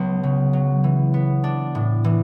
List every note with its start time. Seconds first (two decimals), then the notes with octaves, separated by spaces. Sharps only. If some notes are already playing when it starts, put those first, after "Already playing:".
Already playing: C#2 F#3 B3
0.23 C#3
0.53 F#3
0.84 E3
1.14 B3
1.44 D4
1.75 A2
2.04 E3